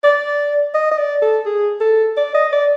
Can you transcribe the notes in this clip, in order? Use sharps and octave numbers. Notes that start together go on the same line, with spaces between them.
D5
D#5
D#5
D5
A4
G#4
A4
D5
D#5
D5